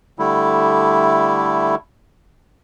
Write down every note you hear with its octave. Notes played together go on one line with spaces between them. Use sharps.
D3 G3 A3 E4